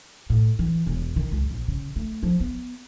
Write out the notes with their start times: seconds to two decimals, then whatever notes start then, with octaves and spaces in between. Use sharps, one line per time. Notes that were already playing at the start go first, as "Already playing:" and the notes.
0.30 A2
0.59 E3
0.86 E1
1.16 D#3
1.31 C#2
1.51 A#1
1.68 C#3
1.96 A3
2.23 F3
2.40 B3